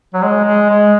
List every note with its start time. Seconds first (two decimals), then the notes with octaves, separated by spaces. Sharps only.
0.14 F#3
0.22 G#3
0.45 G#3
0.69 G#3